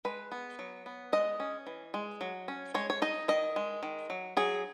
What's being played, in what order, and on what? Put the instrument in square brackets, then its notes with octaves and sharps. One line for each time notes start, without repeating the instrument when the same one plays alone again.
[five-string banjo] G#3 B4
B3
F#3
B3
G#3 D#5
C#4
E3
G#3
F#3
C#4
G#3 C#5
C#5
D#4 D#5
D#3 D#5
G#3
D#3
F#3
F#3 G#4